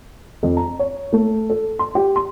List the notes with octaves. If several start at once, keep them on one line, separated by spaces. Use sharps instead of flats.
F2
A#5
C#5
A3
A4
C6
G4
C6